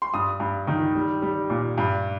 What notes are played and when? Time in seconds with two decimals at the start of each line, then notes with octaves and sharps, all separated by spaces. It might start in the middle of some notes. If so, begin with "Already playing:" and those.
0.02 C6
0.14 G2 D#6
0.40 G2
0.67 D#3
0.95 G3
1.22 G3
1.50 A#2
1.78 G2